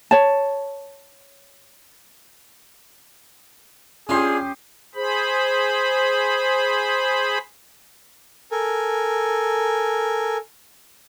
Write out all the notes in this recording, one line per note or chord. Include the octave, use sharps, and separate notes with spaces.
C#5 A5
C#4 D4 F4 G4 G#4 C6 D#6
G#4 C5 B5
A4 A#4 G#5